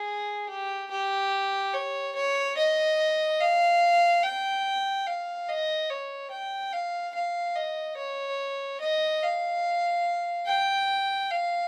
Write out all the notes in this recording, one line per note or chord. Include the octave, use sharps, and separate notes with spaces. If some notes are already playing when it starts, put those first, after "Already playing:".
Already playing: G#4
G4
G4
C#5
C#5
D#5
F5
G5
F5
D#5
C#5
G5
F5
F5
D#5
C#5
D#5
F5
G5
F5